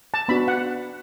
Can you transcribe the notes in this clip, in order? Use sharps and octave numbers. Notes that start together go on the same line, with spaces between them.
A5
B3 D4 F#4 B5
F#5